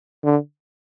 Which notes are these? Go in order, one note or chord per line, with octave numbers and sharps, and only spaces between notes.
D3